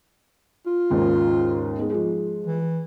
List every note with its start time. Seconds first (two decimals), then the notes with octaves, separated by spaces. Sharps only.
0.66 F4
0.90 D#2 G#2 C#3
1.78 G#3 B3 D#4
1.90 F3 G#3
2.47 E3